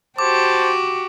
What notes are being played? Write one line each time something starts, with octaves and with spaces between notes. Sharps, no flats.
F#4 G4 C5 A5 D6